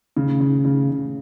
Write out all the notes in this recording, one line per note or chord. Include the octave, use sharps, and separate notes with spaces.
C#3
C#3
C#3
C#3